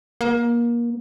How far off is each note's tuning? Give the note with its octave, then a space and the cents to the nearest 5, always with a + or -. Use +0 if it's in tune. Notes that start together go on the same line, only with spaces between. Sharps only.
A#3 +25